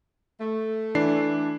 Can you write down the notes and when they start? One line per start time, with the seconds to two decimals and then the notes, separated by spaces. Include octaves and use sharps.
0.40 A3
0.95 E3 D4 C7